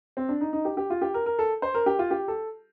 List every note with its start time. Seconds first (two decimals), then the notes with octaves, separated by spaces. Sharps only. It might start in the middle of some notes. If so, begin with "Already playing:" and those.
0.17 C4
0.29 D4
0.41 D#4
0.53 D#4
0.65 G4
0.77 G4
0.90 F4
1.01 G4
1.14 A#4
1.26 A#4
1.39 A4
1.62 C5
1.74 A#4
1.86 G4
1.99 F4
2.11 G4
2.28 A4